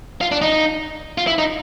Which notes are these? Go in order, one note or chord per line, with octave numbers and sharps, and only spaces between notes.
F4
D4
D#4
F4
E4
D#4